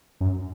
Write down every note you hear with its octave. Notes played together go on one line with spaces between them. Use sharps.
F#2